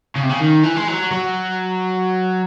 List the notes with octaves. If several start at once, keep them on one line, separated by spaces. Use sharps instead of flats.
C#3
C3
C#3
D#3
E3
G#3
F#3
F#3